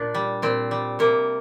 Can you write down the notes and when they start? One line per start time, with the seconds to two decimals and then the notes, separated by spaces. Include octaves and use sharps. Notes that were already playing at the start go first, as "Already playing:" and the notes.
Already playing: A#2 D4
0.14 G3
0.42 A#2 C4
0.71 G3
0.99 C3 A#3